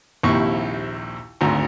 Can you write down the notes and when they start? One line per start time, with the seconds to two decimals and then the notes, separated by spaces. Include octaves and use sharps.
0.23 A#1 D#2 C3 E4 C#6
1.41 G#1 D2 A#5